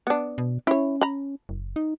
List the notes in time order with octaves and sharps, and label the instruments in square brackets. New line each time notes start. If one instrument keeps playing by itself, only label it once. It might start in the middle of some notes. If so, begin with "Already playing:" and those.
[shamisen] B3 D4
[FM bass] B2
[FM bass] C#4 [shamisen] E4 C#5
[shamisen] A#5 B5
[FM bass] F#1
D#4